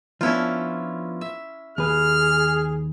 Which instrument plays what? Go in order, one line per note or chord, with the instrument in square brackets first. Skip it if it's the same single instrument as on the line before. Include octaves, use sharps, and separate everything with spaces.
[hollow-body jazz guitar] F3 B3 D4 [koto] C#4 E4 F4
[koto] E5
[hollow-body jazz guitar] D#2 B4 [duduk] G#4 [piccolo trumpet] F6